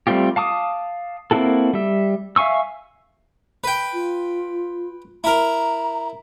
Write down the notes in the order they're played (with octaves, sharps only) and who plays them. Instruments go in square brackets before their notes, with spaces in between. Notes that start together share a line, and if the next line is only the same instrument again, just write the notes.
[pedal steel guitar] G3 A3 C4 F4 G4
F5 A5 D6 D#6
A#3 C4 E4 F#4 A4
G3 E5
E5 F5 G#5 C#6 E6
[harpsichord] B4 G5
[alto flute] F4
[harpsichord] E4 A#4 [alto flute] A#5